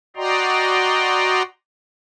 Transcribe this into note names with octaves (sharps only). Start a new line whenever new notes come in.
F#4 D5 D#5 G5 A#5 C6